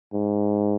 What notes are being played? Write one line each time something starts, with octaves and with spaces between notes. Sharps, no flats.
G#2